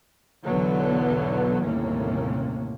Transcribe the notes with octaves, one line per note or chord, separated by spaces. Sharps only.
B1 E2 D3 E3 F#3 B3
G1 D#2 A2 C3 A#3 C#4